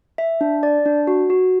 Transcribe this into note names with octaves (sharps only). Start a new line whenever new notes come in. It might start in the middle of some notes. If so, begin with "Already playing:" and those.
E5
D4
D5
D4
F#4
F#4